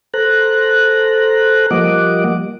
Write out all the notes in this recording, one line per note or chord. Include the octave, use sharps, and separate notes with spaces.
A4 C5 A#5 F#6
F3 G3 A#3 D#5 F#5 D6